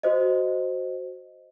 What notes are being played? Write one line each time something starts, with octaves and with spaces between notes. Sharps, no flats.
F#4 C5 D#5